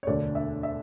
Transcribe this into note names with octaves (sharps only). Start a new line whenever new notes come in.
C#5
E1 D2 D3 D5
E5
E5